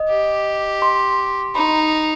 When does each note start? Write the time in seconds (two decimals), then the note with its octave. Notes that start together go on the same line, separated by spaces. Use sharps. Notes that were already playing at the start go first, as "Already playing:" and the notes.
Already playing: D#5
0.10 G4
0.82 C6
1.55 D#4 B5